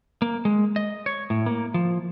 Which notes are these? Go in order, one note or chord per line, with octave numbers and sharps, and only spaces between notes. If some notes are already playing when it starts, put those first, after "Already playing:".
A#3
G#3
D#5
C#5
A2
A#3
F3